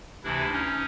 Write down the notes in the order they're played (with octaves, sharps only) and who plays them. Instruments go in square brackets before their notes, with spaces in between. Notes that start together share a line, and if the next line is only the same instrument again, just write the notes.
[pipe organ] D2 C3 E3 D4 E4
C#4 D#4